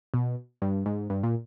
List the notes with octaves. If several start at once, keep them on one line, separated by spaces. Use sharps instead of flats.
B2
G2
G#2
G2
A#2